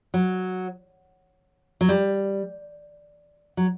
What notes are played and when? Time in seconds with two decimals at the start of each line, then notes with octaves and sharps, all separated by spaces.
0.14 F#3
1.81 F#3
1.89 G3
3.57 F#3